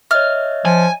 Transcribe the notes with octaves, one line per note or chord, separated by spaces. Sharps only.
C#5 D#5 E5 F6
F3 G#5